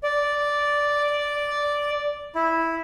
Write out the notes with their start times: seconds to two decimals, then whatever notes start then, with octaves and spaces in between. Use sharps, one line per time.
0.03 D5
2.35 E4